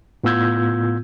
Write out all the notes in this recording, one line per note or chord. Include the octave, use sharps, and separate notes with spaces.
A2 B3 F4 E6 G6 G#6